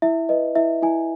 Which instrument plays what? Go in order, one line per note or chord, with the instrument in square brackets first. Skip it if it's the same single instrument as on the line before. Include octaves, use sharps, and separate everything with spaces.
[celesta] E4 E5
B4 D#5
E4 E5
E4 G#5